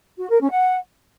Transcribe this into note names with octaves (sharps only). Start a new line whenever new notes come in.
F#4
A#4
C#4
F#5